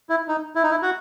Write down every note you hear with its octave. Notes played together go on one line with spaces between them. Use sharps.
E4
D#4
E4
D#4
E4
F#4